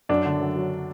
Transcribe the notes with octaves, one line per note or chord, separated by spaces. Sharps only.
F#2 D4
D3
F#2
F#3